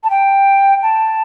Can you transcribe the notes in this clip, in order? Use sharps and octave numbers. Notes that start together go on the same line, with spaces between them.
A5
G5
A5